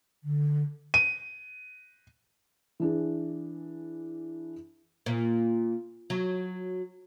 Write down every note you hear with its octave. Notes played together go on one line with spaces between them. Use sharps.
D3
D#7
E3 D4 G#4
A#2
F#3